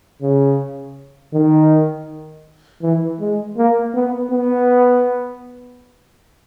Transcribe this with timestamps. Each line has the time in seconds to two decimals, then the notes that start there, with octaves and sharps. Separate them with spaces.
0.22 C#3
1.34 D#3
2.82 E3
3.20 G#3
3.57 A#3
3.94 B3
4.32 B3